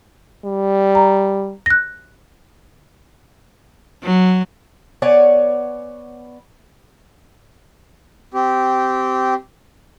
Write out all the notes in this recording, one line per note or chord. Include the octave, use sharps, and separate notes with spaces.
G3
A#5
F#6 A#6
F#3
B3 C#5 D5 G#5
C4 G4